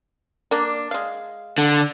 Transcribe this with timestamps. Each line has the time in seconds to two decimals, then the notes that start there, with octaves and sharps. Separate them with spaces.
0.51 A#3 D4
0.91 G#3 F5
1.58 D3